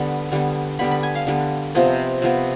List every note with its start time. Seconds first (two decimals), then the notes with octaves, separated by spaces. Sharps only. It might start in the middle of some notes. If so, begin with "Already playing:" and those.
Already playing: D3 G3 B3 B5
0.32 D3 G3 B3
0.79 D3 G3 B3 B5
0.91 B5
1.03 G#5
1.15 F5
1.27 D3 G3 B3
1.75 C3 F3 B3 D#5
2.22 C3 F3 B3